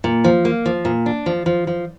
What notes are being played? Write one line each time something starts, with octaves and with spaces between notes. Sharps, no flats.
A#2
F3
A#3
F3
A#2
D4
F3
F3
F3